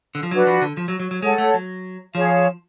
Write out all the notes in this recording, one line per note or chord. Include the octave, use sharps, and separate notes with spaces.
D3
F3
F#3 D4 F#4 B4
F3
D3
F3
F#3
F#3
F#3
G#3 A4 C#5 F#5 A5
A3
F#3
F3 G#4 C#5 F5